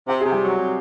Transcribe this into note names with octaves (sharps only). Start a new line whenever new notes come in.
C3 G4
C3 G#4
G3 G4
F#3
C3